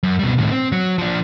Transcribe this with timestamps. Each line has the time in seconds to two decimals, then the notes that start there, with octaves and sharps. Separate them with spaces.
0.03 F#2
0.19 B2 G3
0.38 A2 D#3
0.51 C4
0.72 F#3
0.98 F3 D4